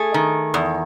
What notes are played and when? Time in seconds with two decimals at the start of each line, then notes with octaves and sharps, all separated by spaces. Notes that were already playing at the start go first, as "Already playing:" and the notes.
Already playing: A3 G#4
0.14 D#3
0.54 E2